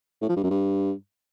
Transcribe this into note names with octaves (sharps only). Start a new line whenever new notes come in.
A2
F3
G2
F#2
G2